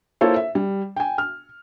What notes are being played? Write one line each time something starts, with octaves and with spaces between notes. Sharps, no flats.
A#3 E4 F4 A4 C5 C#5
E5
G3
G5 G#5
F6